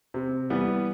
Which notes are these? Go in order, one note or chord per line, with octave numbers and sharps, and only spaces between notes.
C3
E3 G3 B3